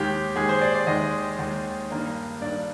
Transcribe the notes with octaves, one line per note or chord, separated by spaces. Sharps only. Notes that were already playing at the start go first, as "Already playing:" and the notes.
Already playing: D#2 D#3 G#3 G4
D#2 D#3 G#3 G#4
C5
D5
D5
D#2 D#3 G#3 D#5
D#2 D#3 G#3
G2 D#3 A#3 D4
G2 D#3 A#3 D4 D5